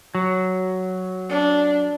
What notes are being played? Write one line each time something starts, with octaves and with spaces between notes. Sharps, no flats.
F#3
D4